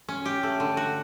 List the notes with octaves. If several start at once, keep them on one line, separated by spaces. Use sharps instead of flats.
C#4
G4
A3
D3
F#4